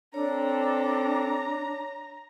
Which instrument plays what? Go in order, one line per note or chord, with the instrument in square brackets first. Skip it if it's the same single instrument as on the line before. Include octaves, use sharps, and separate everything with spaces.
[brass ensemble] C4 A4 [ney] D4 [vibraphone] C#5 [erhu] A#5